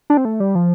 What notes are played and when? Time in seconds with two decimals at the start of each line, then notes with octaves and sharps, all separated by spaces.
0.10 D4
0.17 C4
0.25 A3
0.40 G3
0.55 F3